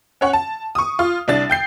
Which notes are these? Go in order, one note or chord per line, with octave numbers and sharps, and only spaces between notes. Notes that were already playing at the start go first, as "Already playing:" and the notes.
C#4 C#5 F#5
A5
C#6 D#6
F4
C2 D4 A6
G5 G6 C7